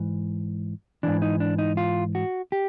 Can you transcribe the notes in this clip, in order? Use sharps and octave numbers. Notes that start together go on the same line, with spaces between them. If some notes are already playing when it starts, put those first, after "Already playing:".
Already playing: G#2 E3
G#2 E3 D4
D#4
D4
D#4
F4
F#4
G4